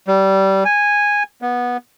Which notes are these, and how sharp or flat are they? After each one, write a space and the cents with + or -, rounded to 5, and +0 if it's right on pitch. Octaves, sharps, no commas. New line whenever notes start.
G3 -20
G#5 -10
B3 -15